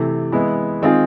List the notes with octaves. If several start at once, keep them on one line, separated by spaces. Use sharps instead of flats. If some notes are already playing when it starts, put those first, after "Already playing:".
Already playing: C3 E3 A3
E3 G#3 B3 E4
D#3 G#3 C4 F4 G#4